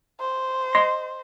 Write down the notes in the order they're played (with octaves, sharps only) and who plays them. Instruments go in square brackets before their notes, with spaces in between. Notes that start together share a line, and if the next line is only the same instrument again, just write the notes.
[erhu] C5
[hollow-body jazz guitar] D#5 C6